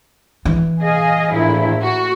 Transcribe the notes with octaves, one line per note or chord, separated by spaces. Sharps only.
E3
G#4 D#5 F5
A#1 A2 E4
F#4